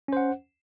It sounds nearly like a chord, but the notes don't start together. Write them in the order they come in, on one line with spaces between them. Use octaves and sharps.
C#4 C5 F#5